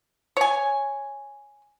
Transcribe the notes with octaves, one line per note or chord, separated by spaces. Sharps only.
C#5 G#5